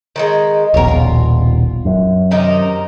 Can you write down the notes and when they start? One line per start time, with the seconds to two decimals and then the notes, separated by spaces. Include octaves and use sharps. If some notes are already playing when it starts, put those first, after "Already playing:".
0.16 D#3 F#3 G#3
0.74 D#1 A#1 B2 A#4 C#5
0.88 F4
1.85 F#2
2.31 C3 D#3 D#4